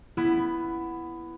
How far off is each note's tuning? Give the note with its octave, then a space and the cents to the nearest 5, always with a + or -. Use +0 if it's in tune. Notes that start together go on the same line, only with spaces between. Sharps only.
B3 +0 E4 +15